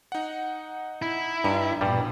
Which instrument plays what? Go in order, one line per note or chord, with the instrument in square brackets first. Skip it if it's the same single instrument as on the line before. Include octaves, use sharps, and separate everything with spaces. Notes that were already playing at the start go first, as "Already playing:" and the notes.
[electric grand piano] D#4 F#5
[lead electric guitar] E4
[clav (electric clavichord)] G2 [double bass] D4 [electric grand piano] D#4 A#5
[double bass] A#1 B2 [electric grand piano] E2 [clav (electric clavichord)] G2 G3